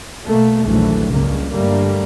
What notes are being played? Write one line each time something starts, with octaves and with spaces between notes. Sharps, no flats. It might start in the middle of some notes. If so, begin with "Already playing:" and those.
B2 A3 A#3
A#1 D#2 A#2 E3 F#3 A3
C#2 G2 C#3 A#3
G2 D3 G3 A3 A#3